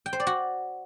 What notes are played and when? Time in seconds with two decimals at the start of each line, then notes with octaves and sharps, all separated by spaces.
0.06 G5
0.13 C5
0.20 D5
0.27 F#4